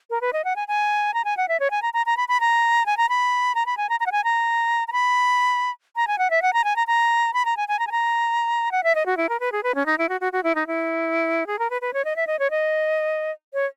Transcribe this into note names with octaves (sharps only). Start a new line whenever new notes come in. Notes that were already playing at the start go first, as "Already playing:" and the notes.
A#4
B4
D#5
F#5
G#5
G#5
A#5
G#5
F#5
E5
C#5
G#5
A#5
A#5
A#5
B5
B5
A#5
G#5
A#5
B5
A#5
B5
G#5
A#5
A#5
F#5
G#5
A#5
A#5
B5
A#5
G#5
F#5
E5
F#5
A#5
G#5
A#5
A#5
B5
A#5
G#5
G#5
A#5
G#5
A#5
F#5
E5
D#5
F#4
E4
A#4
B4
G#4
B4
C#4
D#4
E4
F#4
F#4
F#4
E4
D#4
E4
G#4
A#4
B4
B4
C#5
D#5
E5
D#5
C#5
D#5
C#5